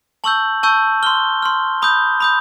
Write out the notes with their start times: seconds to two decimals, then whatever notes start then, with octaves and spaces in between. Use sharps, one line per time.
0.24 A5 C#6 E6 G6 F#7
0.63 A5 C#6 E6 G6
1.03 C6 F6 G7
1.42 C6 F6
1.82 B5 D#6 G6
2.20 B5 D#6 G6